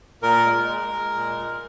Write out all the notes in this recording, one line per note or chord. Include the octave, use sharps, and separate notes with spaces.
A#2 A#4
G#3
G#3
G#3
A#2
A#2